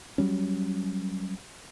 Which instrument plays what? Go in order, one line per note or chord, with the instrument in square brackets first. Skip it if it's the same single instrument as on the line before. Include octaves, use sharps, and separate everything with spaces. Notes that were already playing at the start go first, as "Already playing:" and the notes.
[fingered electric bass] F#3 G3 C#4